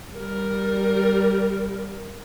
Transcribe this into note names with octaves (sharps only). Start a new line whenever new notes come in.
G3 A#4